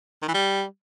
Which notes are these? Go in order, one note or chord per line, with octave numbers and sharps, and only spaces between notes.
D#3
E3
G3